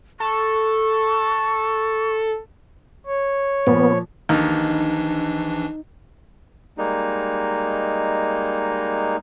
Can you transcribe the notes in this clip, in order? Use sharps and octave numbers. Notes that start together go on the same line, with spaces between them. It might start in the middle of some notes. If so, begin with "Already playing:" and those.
A4 C#6
C#5
A#2 F3 B3
A#1 D#2 E3 D4 D#4
G3 G#3 A#3 D#4